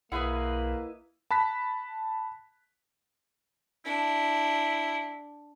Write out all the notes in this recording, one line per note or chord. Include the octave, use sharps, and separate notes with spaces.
B1 A#3 E4 G#4 B4 D#5 F#5
A5 B5 F#6 B6
D4 E4